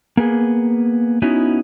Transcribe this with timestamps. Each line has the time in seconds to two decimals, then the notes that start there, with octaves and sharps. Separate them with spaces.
0.17 A#3 B3 G#4
1.22 B3 C#4 D#4 E4 F#4